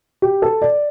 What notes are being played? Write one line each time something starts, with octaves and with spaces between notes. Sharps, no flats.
G4
A4
D5